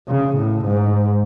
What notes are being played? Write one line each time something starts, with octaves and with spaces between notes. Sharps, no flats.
C#3
A2
G#2